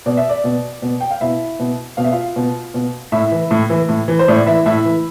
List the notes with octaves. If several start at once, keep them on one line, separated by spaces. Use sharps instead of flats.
B2 D5
E5
D5
B2
B2
G5
F5
B2 E4 E5
B2
B2 F5
E5
F4 F5
B2
B2
A2 E4 E5
E3
A2
E3
A2
E3
C5
A2 D5
E3 E4 E5
A2 E4 E5
E3